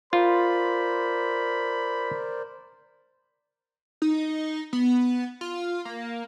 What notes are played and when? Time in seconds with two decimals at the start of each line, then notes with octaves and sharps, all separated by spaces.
0.13 F4 A#4 C5 D5 B5
4.02 D#4
4.73 B3
5.41 F4
5.85 A#3